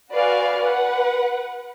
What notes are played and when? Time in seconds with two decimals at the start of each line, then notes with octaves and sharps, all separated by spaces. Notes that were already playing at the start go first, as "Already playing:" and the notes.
0.12 F#4 B4 D5 F5 G#5
0.65 B4 F#5